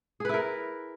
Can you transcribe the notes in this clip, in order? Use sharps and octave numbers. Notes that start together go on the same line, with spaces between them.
E4 G#4 A#4 B4